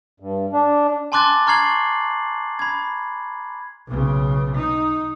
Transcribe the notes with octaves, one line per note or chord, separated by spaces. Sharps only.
G2
D4
G#5 A5 C6 D6 F#6 A6
A#5 C#6 F6 G#6 C7 F#7
B5 G#6
B1 C#3
D#4